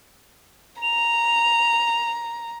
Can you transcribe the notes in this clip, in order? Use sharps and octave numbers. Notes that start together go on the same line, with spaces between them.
A#5 F7